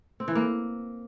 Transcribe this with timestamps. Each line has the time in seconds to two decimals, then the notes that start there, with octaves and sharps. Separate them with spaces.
0.20 C4
0.28 E3
0.35 A#3